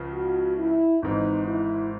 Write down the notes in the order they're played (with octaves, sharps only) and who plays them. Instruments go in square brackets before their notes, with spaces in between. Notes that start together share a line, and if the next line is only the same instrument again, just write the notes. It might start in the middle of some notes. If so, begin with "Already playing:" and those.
Already playing: [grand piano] C#2 C#3 F3
[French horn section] F#4
E4
[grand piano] G#1 G#2 E3 [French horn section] D#4
[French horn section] E4